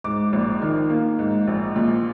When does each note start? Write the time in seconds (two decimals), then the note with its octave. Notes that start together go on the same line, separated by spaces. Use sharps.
0.04 G#2 D6
0.33 A#1
0.62 D#3
0.90 A#3
1.19 G#2
1.47 A#1
1.76 A#2